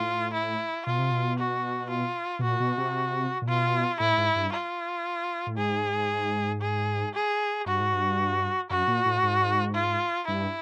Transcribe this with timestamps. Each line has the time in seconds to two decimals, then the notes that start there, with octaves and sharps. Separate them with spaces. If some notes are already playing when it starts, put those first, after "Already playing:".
Already playing: A2 F4
0.34 E4
0.86 B2 F4
0.99 C3
1.11 B2
1.39 F#4
1.90 F4
2.39 B2
2.43 A#2 F#4
2.60 B2
2.78 C3
3.42 A#2
3.47 B2 F4
4.00 A2 E4
4.18 G#2
4.35 G2
4.52 F4
5.47 A2
5.58 G#2 G#4
6.61 G#4
7.14 G#4
7.66 G2 F#4
7.80 G#2
7.94 G2
8.70 F#2 F#4
8.88 A#2
9.06 A2
9.23 G#2
9.75 F4
10.28 G2 E4